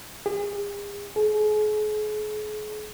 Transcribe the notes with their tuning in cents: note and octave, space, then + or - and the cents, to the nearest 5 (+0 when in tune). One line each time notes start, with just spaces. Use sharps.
G#4 -40
G#4 +40